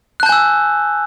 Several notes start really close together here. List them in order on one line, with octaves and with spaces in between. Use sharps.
F#6 A5 G6 G#5 E6